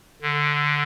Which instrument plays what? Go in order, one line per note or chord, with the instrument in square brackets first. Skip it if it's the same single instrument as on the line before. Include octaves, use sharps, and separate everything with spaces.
[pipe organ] D3